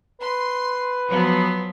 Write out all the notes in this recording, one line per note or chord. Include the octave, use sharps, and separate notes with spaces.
B4 C6
F3 F#3 B3